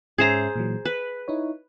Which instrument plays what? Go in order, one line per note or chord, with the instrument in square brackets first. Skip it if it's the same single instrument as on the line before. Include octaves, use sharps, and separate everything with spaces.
[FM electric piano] G#2 C#4 E5 [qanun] G#4 C5 A#5
[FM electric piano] A#2 E3 F#3
[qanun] B4 [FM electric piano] F#6
[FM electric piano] D#4 E4 C#5